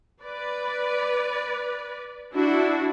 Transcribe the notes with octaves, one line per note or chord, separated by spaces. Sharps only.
B4 D5
D4 E4 F#4